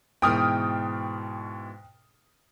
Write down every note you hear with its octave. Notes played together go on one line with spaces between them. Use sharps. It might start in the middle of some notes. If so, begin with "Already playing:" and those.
G#2 B2 E3 G5 D#6 F6